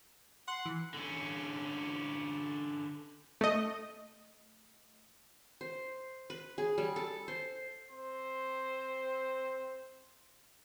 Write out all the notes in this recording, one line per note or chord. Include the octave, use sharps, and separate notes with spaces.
F#5 C6
E3
D3 C#4
A3 D#5
C5
B4
G#4
G3
A4
C5
C4 C5